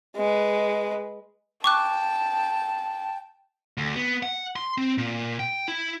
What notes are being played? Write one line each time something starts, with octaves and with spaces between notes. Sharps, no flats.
G#3 B4
G5 A5 C#6 D6 F#6
D2
B3
F#5
C6
C4
A#2
G5
E4